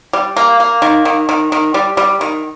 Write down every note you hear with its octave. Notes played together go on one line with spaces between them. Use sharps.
G3
A#3
A#3
D#3
D#3
D#3
D#3
G3
G3
D#3